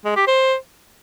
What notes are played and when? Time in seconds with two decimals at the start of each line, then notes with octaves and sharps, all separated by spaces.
0.05 G#3
0.16 G4
0.27 C5